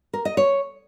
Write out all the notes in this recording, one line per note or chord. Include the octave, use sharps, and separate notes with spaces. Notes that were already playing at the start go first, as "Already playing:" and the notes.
A#4
D#5
C#5